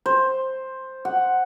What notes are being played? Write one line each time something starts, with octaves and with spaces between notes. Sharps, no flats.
C5
F#5